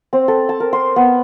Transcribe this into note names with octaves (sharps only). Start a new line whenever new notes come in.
C4
A4
A5
A#4
C6
B3